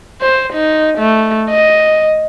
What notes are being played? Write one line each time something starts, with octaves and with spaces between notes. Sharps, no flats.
C5
D#4
A3
D#5